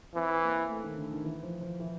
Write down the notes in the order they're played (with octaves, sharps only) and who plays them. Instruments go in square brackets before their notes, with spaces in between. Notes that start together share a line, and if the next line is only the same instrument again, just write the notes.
[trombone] E3 [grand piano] C4
[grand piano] A#3
A3
D#3
D3
D#3
E3
F3
F3
E3